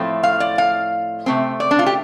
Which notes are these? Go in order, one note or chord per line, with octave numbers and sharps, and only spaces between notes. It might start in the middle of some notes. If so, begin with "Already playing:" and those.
Already playing: A2 F3 A3 C4
F5
D5
F5
C3 A3 C4
D5
D4
F4
G4